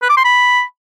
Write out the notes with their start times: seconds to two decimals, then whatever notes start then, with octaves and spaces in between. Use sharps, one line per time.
0.02 B4
0.10 D6
0.17 C6
0.25 B5